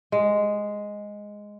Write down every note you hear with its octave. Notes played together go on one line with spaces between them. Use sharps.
G#3